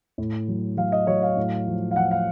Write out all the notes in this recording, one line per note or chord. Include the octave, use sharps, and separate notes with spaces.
A2
F#3
F#3 F5
D#5
F#3 C#5
F5
A2
F3
F5
F3 F#5
F5